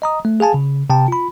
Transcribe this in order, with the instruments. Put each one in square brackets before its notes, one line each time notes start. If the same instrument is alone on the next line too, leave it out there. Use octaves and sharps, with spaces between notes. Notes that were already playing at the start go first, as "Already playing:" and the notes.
[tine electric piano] D#5 A#5 D#6
A3
G#4 F5 G#5 A5
C#3
C3 G5 A5
F4 B5